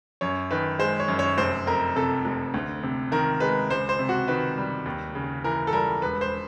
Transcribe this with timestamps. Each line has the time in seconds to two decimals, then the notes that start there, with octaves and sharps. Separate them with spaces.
0.21 F#2 C#5
0.51 D#3 B4
0.79 G#3 C5
1.00 C#5
1.08 F#2
1.19 C#5
1.38 F1 C5
1.67 F2 A#4
1.96 C3 A4
2.25 F1
2.54 D2
2.83 C3
3.12 D#3 A#4
3.40 G#3 B4
3.70 C#2 C5
3.89 C5
3.99 C3
4.09 F#4
4.28 D#3 B4
4.58 G3
4.86 D#2
5.15 C#3
5.44 E3 A#4
5.67 A4
5.73 G3 A#4
6.02 E1 B4
6.21 C5